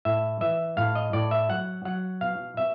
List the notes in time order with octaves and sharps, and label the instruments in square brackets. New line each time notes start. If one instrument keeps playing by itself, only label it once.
[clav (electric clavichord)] A2 E5
E3 E5
A2 F5
D#5
A2 D5
E5
F#3 F#5
F#3 F#5
B2 F5
B2 E5